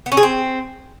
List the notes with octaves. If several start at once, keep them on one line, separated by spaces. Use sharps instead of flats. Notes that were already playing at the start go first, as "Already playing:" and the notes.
B3
C#4
G#4
C4